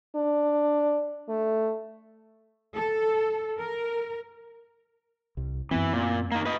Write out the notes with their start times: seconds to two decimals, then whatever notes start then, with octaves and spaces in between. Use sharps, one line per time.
0.15 D4
1.29 A3
2.74 A4
3.58 A#4
5.37 C2
5.71 F#2 E3 B3 C4
5.93 A#2
6.32 A#3 D#4
6.45 B4 D#5